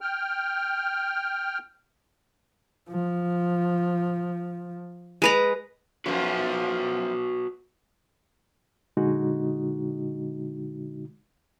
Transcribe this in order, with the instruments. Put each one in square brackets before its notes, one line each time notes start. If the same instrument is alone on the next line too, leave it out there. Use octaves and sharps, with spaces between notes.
[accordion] G5 F6
[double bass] F3
[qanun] G#3 B4 A#5
[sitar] F#2 F3 [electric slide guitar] F#4 B4 C#5
[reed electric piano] A#2 D3 G#3 D#4 F#4